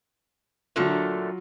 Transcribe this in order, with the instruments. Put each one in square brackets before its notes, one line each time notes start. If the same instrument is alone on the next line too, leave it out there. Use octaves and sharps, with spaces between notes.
[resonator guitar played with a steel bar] A#2 D3 A3 [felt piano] F#3 F4